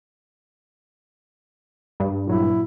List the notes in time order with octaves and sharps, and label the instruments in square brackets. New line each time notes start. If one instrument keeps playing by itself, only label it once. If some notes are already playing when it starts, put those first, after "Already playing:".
[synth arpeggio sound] G2
[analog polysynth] A#2 F#3 [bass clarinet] E4